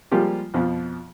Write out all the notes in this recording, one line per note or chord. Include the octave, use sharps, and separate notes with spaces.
F3 G3 G#3 A#3 F4 G4
F2 B2 F3